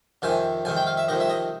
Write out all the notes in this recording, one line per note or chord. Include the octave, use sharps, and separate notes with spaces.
F2 C3 D#3 G#5
F2 C3 D#3 G#5
G5
F5
E5
F2 C3 D#3 D#5
E5
D#5